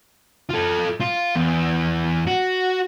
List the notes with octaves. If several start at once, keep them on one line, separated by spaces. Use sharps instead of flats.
F4 A4
F4
E2
F#4